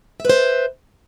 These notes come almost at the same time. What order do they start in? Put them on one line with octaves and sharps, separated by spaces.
E5 B4 C5